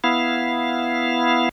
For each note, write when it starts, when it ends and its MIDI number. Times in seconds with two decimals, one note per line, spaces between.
0.04 1.49 59
0.04 1.49 64
0.04 1.49 77